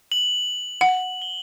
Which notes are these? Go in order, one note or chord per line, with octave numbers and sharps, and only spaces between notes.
F#7
F#5
G7